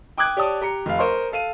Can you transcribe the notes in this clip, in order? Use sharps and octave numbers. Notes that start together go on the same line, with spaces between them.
G5 D6 D#6 F#6 G#6
G4 C#5 D5 A5 D#6
G4 A#5 C#7
F1 F5
A#4 C5 D#5 G#5 C6 C#6
A4 F5 D#7